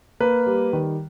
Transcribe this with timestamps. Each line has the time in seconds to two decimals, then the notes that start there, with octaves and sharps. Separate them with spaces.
0.20 A#3 B4
0.46 G3
0.73 D#3